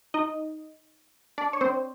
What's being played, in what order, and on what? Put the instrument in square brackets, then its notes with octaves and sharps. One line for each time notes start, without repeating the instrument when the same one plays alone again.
[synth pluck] D#4 D#5
D4 D5
C#5
C4 C5